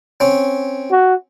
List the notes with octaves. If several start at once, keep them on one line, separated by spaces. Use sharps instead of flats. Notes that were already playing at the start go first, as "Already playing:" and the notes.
C4 C#4
F#4